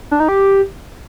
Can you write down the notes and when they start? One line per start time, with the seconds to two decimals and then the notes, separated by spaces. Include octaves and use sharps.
0.11 D4
0.20 D#4
0.28 G4